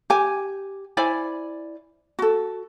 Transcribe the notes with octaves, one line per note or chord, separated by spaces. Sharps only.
G4 G#5
E4 C5 D5 G#5
F#4 A4